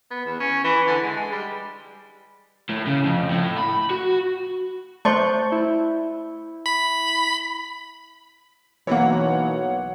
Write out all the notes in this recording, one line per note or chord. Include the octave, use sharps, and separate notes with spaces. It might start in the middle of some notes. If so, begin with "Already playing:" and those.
B3
E2
C#4
E3
D3
G#3
G#3
G3
A2
C#3
F2
A2
B5
F#4
A3 C5 D5 A5 C6 C#6 G6
E4
B5
B1 E3 A#3 C#5 F#5